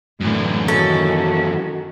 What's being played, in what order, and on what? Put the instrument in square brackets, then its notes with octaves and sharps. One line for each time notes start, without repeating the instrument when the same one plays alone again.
[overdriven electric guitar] F#2 E3 [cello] A2 D3
[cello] D#3 F#4 [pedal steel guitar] C#4 [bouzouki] A4